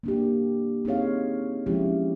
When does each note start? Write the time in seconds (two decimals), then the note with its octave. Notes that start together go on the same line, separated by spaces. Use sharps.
0.03 A#3 D4 G4
0.85 C4 D#4 G#4 C#5 F5
1.66 F3 G#3 C#4 E4 G4